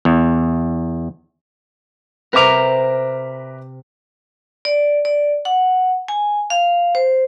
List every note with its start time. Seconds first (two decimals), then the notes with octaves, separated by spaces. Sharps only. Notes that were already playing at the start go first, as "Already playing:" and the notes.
0.05 E2
2.33 C3 C4 A#4 B4 E5 A#5 D6
4.65 D5
5.05 D5
5.45 F#5
6.08 G#5
6.50 F5
6.95 C5